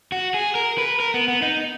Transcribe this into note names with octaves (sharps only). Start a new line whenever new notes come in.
F#4
G#4
A#4
B4
A#4
B3
B3
D#4